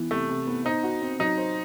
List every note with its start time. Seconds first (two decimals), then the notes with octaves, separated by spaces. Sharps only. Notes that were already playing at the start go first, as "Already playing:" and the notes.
Already playing: E3 B3
0.11 C3 A3
0.29 C3
0.47 B3
0.65 D#4 C5
0.83 F#4
1.01 C4
1.19 F#3 D#4
1.38 C5